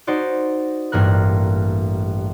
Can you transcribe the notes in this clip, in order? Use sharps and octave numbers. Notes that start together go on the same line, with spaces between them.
D#4 F#4 C5 D5
A1 G2 A#3 A#4 F#6